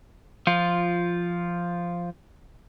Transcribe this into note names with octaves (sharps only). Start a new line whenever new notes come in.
F3 F4